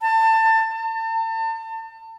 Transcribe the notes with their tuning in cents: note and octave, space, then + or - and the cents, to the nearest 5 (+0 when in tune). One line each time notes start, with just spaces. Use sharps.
A5 +25
A5 +35